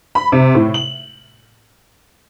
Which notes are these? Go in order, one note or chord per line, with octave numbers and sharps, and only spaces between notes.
B5
C3
A2
F#7